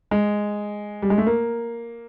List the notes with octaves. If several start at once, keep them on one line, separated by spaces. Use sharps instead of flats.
G#3
G3
G#3
A3
A#3